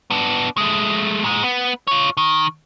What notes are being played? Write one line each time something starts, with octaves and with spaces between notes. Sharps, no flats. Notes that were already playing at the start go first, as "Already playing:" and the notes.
B3 D4
G#3 A3
A#2 G#3
B3
F4 C#5
D#3